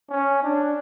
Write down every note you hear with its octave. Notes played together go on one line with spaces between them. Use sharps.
C#4
D4